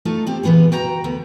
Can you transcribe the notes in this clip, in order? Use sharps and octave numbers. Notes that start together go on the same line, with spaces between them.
A3 D#4 F4 A4
C4 G4
A#2 E3 B3 F4 G#4
F#4 G5 A#5
D2 B3